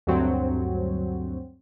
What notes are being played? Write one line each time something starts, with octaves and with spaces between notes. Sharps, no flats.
D2 G2 F#3 C4